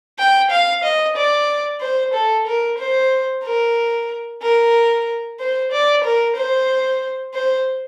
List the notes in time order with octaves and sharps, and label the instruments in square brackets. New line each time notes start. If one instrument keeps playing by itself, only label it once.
[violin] G5
F5
D#5
D5
C5
A4
A#4
C5
A#4
A#4
C5
D5
A#4
C5
C5